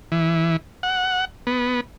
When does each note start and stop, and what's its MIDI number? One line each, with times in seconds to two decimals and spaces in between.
0.12 0.57 52
0.83 1.25 78
1.47 1.81 59